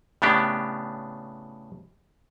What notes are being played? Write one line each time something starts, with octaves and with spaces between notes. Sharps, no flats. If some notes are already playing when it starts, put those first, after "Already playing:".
A2 C#3 B3 D4 G4